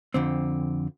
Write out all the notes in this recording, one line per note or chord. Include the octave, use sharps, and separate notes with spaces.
F2 D3 C4